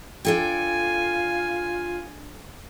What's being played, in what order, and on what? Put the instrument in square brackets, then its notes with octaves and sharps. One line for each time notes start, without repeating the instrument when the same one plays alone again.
[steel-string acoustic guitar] D4 A4 G5 [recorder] F4 [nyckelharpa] G#5